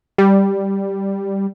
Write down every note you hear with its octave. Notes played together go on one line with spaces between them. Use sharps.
G3